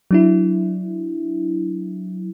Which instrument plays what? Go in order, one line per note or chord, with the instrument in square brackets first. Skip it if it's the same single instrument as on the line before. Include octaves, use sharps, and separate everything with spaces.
[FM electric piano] F#3 D4 E4